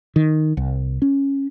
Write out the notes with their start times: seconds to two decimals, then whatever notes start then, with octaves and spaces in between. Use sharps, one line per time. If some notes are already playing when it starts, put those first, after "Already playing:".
0.16 D#3
0.57 C2
1.02 C#4